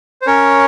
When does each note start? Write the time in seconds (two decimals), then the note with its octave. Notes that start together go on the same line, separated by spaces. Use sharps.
0.22 C5
0.27 C#4 A#4 C#5